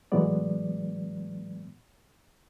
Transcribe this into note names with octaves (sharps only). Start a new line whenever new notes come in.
A2 E3 F#3 G#3 B3 D5